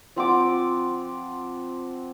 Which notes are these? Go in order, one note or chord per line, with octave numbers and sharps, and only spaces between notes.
F3 C4 F#5 D6